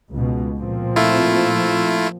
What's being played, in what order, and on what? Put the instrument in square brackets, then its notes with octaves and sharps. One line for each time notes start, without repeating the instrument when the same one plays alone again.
[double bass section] C#2 B2
A#2 F3 C4
[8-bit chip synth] A3 E4 F4